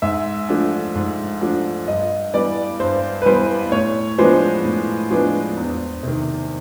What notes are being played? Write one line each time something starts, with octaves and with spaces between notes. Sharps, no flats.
G#2 E5
F3 A3 D4
G#2
F3 A3 D4
G2 D#5
E3 G3 B3 D5
G2 C5
B4
E3 G3 B3 C5
A2 C#5
F3 G#3 B3 D4 C5
A2
F3 G#3 B3 D4
E2
C3 D#3